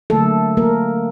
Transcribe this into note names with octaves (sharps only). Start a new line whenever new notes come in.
D3 F#3 A3 A#3 A4
A#3 A#4